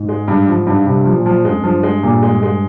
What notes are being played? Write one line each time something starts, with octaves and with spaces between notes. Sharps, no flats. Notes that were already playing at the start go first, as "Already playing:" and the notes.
Already playing: G#2
G#3
G2
F3
G2
G2 C3
F3
A#2
F3
G2 G#3
F2
G2 F3
G#3
A#2
G#3
G#3